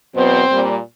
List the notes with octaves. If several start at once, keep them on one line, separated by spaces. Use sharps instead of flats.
E2 B2 F#3 B3 C4 C5
A#2 G3 A#3